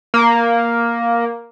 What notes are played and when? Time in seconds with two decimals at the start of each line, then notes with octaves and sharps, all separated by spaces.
0.14 A#3